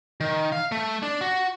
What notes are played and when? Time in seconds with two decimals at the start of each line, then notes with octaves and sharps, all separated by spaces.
0.21 D#3
0.52 F5
0.72 A3
1.03 D4
1.21 F#4